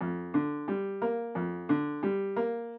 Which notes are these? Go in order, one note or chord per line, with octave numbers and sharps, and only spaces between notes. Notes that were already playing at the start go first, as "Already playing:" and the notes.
F2
D3
G3
A#3
F2
D3
G3
A#3